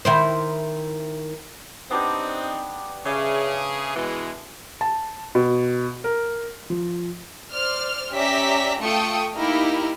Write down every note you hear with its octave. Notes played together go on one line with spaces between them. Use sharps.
D#3 E4 C5
B3 C4 D4 D#4 G4
C#3 G#4 D5 E5 G#5
B2 E3 G#3
A5
B2
A#4
F3
C5 D5 F6
C#4 G4 D5 E5 A#5 B6
A3 F4 G5 C#6 D#6 C#7
A#3 D#4 E4 G4 A#4